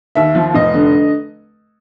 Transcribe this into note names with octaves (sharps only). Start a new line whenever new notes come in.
D#2 E5
F3
F1 D#5
D3